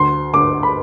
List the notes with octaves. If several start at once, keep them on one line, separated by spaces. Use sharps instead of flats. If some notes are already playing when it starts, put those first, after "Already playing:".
Already playing: D2 C6
D3 D6
B5